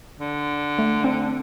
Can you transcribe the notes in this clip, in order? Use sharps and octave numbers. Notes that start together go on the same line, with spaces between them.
D3
A3
C4